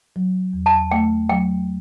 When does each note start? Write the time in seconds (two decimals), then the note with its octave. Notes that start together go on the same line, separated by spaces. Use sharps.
0.16 F#3
0.53 E2
0.66 A5
0.91 A3 G5
1.29 F#3 G5